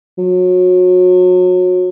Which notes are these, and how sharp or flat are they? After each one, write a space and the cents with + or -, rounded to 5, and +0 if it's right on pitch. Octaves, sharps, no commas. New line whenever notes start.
F#3 -30